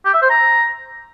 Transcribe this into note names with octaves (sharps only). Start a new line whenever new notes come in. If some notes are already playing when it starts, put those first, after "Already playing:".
G4
E5
C5
A#5